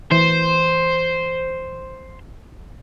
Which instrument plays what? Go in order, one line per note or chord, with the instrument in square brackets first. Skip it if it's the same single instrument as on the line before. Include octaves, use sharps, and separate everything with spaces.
[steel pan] E3 [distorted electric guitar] C5